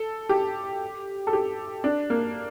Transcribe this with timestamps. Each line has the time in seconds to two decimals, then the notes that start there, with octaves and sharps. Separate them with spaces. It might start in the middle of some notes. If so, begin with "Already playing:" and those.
Already playing: A4
0.29 G4
1.27 A4
1.33 G4
1.84 D4
2.10 A#3